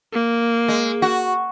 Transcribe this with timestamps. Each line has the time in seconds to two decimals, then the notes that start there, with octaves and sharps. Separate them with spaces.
0.13 A#3
0.68 G#3
1.02 F#4